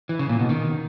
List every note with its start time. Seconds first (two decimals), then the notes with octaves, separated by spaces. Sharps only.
0.09 E3
0.19 C#3
0.29 A#2
0.39 B2
0.49 D#3